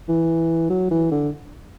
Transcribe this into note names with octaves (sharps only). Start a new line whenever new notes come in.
E3
F#3
E3
D3